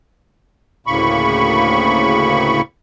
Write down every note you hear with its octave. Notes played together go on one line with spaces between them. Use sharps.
D2 A2 C#3 A#3 B5 C#6